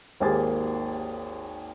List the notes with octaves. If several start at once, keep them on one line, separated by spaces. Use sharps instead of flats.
G#1 D#2 A#3 G4 G#4 A6